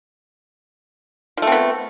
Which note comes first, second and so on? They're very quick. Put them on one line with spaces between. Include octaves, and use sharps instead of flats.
F3 A3 C4 B3